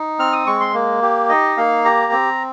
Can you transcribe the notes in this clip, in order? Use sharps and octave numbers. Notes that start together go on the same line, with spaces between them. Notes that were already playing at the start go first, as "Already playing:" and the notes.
Already playing: D#4
C4 F6
D#6
G#3 C#6
C6
A#3
G4
D#4 D#5
A#3 F5
G4 A#5
C4